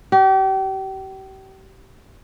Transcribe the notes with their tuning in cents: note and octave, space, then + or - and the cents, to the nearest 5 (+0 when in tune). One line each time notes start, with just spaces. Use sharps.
G4 -35